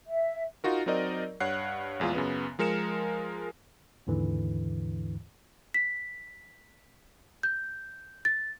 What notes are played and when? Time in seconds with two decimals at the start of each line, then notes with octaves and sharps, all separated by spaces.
0.06 E5
0.64 D#4 F4 F#4 A#4
0.86 F#3 C4 D#4 A#4 D5 D#5
1.40 G2 C#5 F#5 F#6 C7
2.00 A#1 E2 G#3 F4
2.14 F#2 C#3 B3
2.59 F3 G#3 A#4 C#7 E7
4.07 D#2 G#2 D3 E3
5.74 B6
7.43 G6
8.25 A6